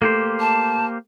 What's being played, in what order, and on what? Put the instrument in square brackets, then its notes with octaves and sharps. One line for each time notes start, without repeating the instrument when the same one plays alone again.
[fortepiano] A3 [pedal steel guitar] A#3 G4 C5
[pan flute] A5